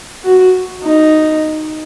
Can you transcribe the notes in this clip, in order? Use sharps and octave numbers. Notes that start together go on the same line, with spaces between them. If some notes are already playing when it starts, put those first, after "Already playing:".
F#4
D#4